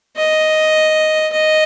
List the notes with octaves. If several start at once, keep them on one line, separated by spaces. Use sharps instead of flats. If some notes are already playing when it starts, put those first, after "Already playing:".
D#5
D#5